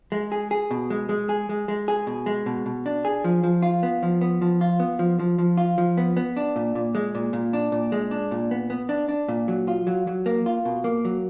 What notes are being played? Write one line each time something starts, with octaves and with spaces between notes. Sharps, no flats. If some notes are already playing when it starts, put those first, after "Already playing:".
G#3
G#4
G#4
B2
G#3
G#3
G#4
G#3
G#3
G#4
B2
G#3
B2
B2
D4
G#4
F3
F3
F4
B3
F3
B3
F3
F4
B3
F3
F3
F3
F4
F3
B3
B3
D4
A#2
A#2
G#3
A#2
A#2
D4
A#2
G#3
D4
A#2
B3
B3
D4
D4
A#2
F#3
F4
F#3
F#3
A#3
F4
B2
A#3
F#3